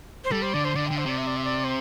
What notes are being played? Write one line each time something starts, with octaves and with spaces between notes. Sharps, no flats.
C5
G3 A4
C5
D3 D5
C5
D3 D5
D3 G5
C5
C3 D5
E5
D5
E5
D5
C5